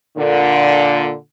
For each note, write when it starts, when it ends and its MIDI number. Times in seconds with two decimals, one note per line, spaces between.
0.17 1.13 46
0.17 1.13 50